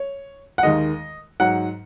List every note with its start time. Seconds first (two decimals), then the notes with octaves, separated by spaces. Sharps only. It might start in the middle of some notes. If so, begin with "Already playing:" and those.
Already playing: C#5
0.58 F#5
0.63 D#2 D#3 G#3 D#5
1.40 G#2 F#3 F#5